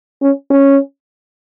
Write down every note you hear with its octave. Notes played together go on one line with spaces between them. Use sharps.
C#4
C#4